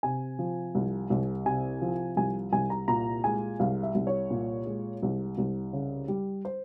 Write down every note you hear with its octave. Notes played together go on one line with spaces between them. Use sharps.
C3 G#5
F3
C2
C2
C3 G#5
F3
C2 G#5
C2 G#5
A#5
A#2 A#5
G#3 G#5
C2 F5
E5
C2
C#5
A#2
G#3
C2
C2
C#3
G3
C5